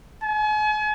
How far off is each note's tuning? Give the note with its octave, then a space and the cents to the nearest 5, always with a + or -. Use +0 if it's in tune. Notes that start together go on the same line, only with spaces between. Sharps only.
G#5 +40